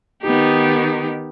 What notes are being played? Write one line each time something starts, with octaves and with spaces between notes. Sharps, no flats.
D#3 B3 D#4 G4